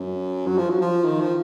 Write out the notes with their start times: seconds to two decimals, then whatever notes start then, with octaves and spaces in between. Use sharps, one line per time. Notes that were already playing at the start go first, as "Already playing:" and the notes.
Already playing: F#2
0.47 F#3
0.58 F3
0.70 F#3
0.82 F3
1.05 D#3
1.20 F3